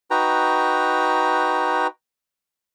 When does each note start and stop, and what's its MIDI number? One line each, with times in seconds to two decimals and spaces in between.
0.11 1.87 63
0.11 1.87 66
0.11 1.87 71
0.11 1.87 79
0.11 1.87 82